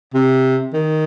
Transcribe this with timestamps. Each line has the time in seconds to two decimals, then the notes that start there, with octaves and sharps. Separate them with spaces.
0.15 C3
0.74 D#3